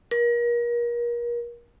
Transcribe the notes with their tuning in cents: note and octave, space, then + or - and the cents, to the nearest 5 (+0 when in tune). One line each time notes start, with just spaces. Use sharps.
A#4 +35